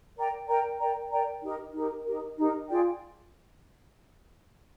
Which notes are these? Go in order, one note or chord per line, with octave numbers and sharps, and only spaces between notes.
A#4 D5 G5 A#5
A#4 D5 G5 A#5
A#4 D5 G5 A#5
A#4 D5 G5 A#5
D#4 G4 A#4
D#4 G4 A#4
D#4 G4 A#4
D#4 G4 A#4
F4 G#4 D5 G5